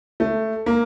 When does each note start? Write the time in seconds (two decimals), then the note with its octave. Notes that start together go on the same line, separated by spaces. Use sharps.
0.20 A3
0.66 A#3